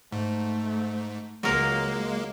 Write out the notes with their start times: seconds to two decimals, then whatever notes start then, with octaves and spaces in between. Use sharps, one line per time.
0.12 G#2 A3
1.43 C#2 F#3 G#3 A#3 A#4